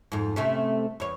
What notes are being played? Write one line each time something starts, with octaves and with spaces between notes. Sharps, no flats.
F2 G#2
C3 A3 C#4
E2 C#5